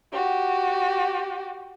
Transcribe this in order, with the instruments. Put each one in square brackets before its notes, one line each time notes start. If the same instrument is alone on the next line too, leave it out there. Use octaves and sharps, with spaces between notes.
[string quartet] F#4 G4